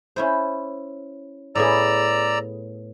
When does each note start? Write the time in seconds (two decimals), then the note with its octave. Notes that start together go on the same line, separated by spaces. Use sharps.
0.16 C#4 E4 C5
1.55 A2 B3 G#4 D5 A#5 E6